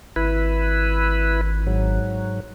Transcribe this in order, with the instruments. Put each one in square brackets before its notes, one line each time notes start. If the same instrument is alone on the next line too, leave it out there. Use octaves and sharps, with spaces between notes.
[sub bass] G#1 [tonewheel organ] E4 B4
[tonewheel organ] G#2 F#3